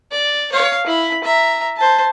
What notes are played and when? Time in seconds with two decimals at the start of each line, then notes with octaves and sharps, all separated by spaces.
0.12 D5
0.52 C#5 F5
0.86 E4 B5
1.24 E5 A#5
1.77 C5 A5